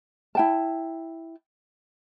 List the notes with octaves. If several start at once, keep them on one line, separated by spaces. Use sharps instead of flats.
E4 G5 A5